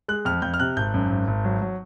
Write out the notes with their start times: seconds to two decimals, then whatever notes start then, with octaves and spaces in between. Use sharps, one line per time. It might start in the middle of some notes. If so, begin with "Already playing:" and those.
0.08 G#3 F#6
0.25 F2 F6
0.42 F2 G6
0.54 F6
0.60 C3 F#6
0.76 G#1 G6
0.94 F#2
1.10 G#1
1.27 G#1
1.45 F#3
1.62 F#3